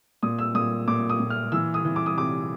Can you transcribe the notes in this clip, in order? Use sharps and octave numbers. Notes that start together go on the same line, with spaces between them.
A#2 D#6
E6
A#2 D#6
A#2 D6
D#6
A#2
F6
E3 E6
D#6
E3
D6
D#6
C3 D6